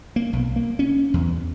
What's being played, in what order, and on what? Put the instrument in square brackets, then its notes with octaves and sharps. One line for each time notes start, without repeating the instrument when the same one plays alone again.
[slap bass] A#3
B1
A#3
C#4
E2